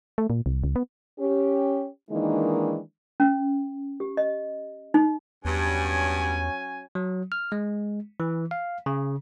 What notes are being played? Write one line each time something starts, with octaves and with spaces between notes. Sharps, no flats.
A3
A#2
C2
C#2
B3
C#4 G4
D#3 E3 G#3 A#3 D4 D#4
C#4
G4
D#5
D#4
E2 G2 F#3 C#4 G#5
F#3
F6
G#3
E3
F5
C#3